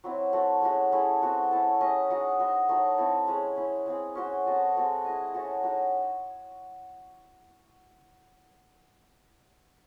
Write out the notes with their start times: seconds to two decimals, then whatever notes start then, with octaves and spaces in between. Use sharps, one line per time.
0.04 F#3 C4 E4
0.33 A3 C4 F#4
0.62 G#3 C#4 F#4 C5
0.92 A3 C#4 E4 G#4
1.22 C4 F#4 C5
1.51 C#4 E4 A4
1.80 C#4 G#4 D#5
2.10 G#3 D#4 F#4
2.39 D#4 F#4 C5
2.69 F#3 A3 D#4
2.97 A3 C4 E4 A4
3.27 G#3 C#4 G#4
3.56 C#4 E4 C5
3.86 G#3 C4 E4 G#4
4.15 C#4 F#4 C5
4.46 C4 F#4 A4 D#5
4.74 G#3 C4 F#4 A4
5.05 E4 G#4 D#5
5.34 A3 C#4 F#4 A4
5.63 G#3 D#4 F#4 C#5